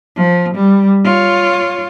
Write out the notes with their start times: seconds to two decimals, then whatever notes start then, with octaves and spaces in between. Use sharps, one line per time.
0.16 F3
0.55 G3
1.04 F4 C#5